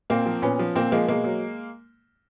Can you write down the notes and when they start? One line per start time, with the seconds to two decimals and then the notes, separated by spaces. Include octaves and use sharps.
0.10 A#2 A#3 C4
0.26 F3
0.42 A#2 B3 C#4
0.59 F3
0.75 A#2 A#3 C4
0.92 F3 G#3 A#3
1.08 B2 G#3 A#3
1.24 F#3